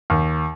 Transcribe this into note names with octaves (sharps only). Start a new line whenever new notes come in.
D#2